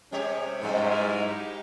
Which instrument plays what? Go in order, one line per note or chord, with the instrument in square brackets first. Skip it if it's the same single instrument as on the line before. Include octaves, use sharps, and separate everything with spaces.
[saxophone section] C3 [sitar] G3 G4 C#5 [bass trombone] C#4
[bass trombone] G#2 [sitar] F#3 G#3 B3
[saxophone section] E4 G#4 A#4
D#4 G4